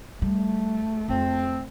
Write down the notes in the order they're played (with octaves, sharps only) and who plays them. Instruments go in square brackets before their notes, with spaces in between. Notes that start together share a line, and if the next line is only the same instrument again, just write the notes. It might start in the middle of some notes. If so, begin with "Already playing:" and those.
[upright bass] G3 [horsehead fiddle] A3
[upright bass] F2 [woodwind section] C4